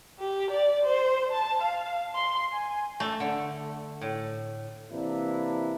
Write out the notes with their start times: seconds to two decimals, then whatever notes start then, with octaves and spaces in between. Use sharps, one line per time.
0.20 G4
0.51 D5
0.84 C5
1.32 A5
1.62 F5
2.15 C6
2.53 G#5
3.00 A3
3.20 D3
4.01 A2
4.90 C3 E3 A#3 D4 E4